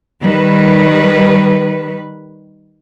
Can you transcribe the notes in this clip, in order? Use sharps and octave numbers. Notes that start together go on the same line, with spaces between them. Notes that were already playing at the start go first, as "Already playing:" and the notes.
D#3 G3 B4